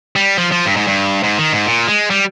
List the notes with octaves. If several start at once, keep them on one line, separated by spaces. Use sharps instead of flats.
G3
F3
F3
G2
G#2
G2
G#2
D#3
G#2
A#2
G#3
G3